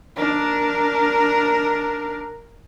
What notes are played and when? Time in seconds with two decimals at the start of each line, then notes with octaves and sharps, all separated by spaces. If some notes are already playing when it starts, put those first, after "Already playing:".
0.16 D4 A#4